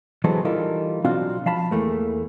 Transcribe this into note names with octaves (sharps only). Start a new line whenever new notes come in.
E3 F#3 G#3 B3 A4 C5
E3 G3 D#4 F4 A4 A#4
B1 C4 D4 F4 F#4 F5
F3 F5 A5 B5
E2 E3 A3 A#3